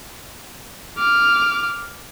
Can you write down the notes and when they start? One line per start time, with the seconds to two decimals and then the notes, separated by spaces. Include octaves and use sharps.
0.97 D6 F6